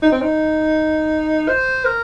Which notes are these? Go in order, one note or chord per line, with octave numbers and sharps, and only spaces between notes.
D#4
C4
D#4
C5
A#4